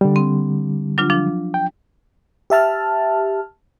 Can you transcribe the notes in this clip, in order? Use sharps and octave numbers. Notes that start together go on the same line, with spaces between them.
D3 G3
C4
F#3 D4 F4
F3 D4
G5
G4 E5 A5 F6